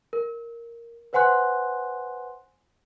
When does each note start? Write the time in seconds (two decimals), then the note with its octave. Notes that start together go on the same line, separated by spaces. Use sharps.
0.13 A#4
1.13 B4 C5 F#5 G#5 C6 F#6